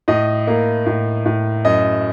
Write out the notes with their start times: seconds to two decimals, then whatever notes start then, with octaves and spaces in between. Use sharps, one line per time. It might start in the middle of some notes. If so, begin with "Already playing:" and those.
0.08 A2 D#5
0.47 A#3
0.86 A2
1.25 A2
1.65 F#2 D#5